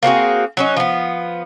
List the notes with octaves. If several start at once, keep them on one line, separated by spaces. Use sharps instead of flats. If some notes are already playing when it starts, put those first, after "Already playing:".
A#3 C4 F#4 G#4
F#3 C#4 D#4
F3 B3